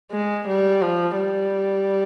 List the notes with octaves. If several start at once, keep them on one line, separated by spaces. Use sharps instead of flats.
G#3
G3
F3
G3